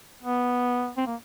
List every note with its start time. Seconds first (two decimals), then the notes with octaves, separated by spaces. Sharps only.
0.23 B3
0.97 C4
1.07 A#3